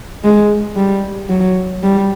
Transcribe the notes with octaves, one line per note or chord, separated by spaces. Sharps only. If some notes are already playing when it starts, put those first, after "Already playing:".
G#3
G3
F#3
G3